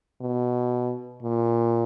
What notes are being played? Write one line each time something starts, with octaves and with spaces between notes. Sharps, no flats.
B2
A#2